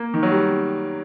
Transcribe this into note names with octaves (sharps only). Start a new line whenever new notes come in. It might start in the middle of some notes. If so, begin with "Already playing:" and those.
Already playing: A#3
D#3
F#3
G3